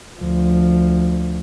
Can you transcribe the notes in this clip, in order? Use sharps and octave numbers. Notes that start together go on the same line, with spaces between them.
D2 F3